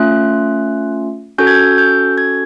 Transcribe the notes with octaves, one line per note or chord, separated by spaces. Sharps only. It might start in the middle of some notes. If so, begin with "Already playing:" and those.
Already playing: A3 C#4 F4 F#6
C#4 F#4 A4 G6
G#6
G6
G6
G#6